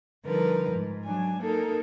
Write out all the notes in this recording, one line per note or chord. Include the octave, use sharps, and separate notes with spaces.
D3 F3 G3 D#4 A#4 B4
G#2
F#3 D4 G#5
A#3 D#4 A4 A#4